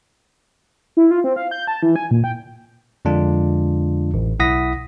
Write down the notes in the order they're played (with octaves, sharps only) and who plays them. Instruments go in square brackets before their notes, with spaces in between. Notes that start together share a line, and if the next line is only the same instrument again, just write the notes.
[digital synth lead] E4
F4
C4
F5
G6
A5
E3
G#5
A#2
G5
[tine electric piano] F2 D3 G#3 D4 F4
A1
B1 E4 F#5 D#6 A#6 B6